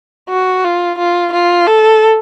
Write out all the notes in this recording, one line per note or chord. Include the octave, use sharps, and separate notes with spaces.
F#4
F4
F4
F4
A4